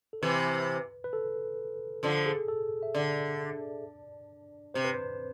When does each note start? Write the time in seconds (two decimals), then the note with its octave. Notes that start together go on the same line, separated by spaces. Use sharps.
0.13 A4
0.22 C3 E3 B4
1.04 B4
1.13 A4
2.03 D3 F3 A4
2.26 G#4
2.48 A4
2.83 E5
2.95 D3 D5
4.74 C3 C5
4.85 B4
4.94 C5